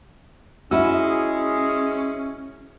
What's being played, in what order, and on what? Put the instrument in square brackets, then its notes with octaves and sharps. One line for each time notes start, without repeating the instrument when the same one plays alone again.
[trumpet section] G#3 G#4 [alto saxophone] C#4 [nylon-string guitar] E4 F#4 [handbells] E5 E6